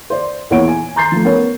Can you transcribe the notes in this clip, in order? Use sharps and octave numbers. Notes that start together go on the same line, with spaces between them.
C5 D5
E2 A#2 E4 C#5 F#5 D7
G#5
A#5 C6 G6 A6 C7
F3 A3
B3 C#4 A#4 C#5